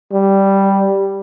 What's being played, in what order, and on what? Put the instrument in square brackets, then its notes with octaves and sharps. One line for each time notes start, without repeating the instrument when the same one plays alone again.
[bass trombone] G3